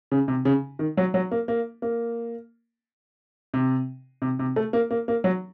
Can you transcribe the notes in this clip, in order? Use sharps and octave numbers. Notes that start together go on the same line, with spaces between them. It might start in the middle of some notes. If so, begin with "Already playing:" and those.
C#3
C3
C#3
D#3
F#3
F#3
A#3
A#3
A#3
C3
C3
C3
A3
A#3
A#3
A#3
F#3